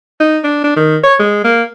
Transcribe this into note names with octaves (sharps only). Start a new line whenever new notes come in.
D#4
D4
D4
D#3
C#5
G#3
A#3